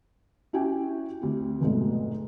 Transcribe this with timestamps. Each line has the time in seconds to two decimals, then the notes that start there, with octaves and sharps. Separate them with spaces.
0.53 C#4 E4 F#4 G4 G5 G#5
1.22 D2 C4 G4
1.61 F1 B1 G#2 A3